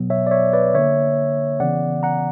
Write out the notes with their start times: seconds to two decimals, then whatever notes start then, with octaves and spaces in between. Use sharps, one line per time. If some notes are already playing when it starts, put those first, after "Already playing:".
Already playing: B2 F#3 B3
0.10 C#5 E5
0.27 D5
0.31 C#5 E5
0.53 B4 D5
0.74 D3 A#3 C#5 E5
1.60 C#3 E3 B3 D5 F#5
2.03 F#5 A#5